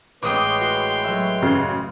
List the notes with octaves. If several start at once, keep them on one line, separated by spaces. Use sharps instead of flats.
A1 G#3 B4 C#5 G5 C6 D6 D#6
F#4 C7
F#3 A3 E5
A1 F#2 C#3 C6